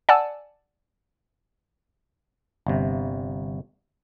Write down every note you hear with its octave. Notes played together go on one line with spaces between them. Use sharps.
D5 F#5 G#5 A5 E6
G1 C3